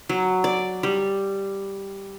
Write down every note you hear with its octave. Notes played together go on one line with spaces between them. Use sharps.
F#3
D5
G3